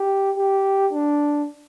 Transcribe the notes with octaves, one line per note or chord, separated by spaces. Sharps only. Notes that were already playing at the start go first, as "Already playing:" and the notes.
Already playing: G4
G4
D4